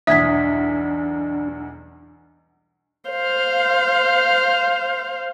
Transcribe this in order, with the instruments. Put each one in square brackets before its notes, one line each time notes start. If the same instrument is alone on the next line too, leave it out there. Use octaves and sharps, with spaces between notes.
[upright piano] B1 E2 G2 [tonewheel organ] D4 [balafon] E5 [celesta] D#6 G#6 B6
[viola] C5 F5